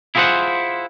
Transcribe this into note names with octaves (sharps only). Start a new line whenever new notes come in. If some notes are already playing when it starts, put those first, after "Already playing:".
E4 F4 G#4 A#4 C5 F#5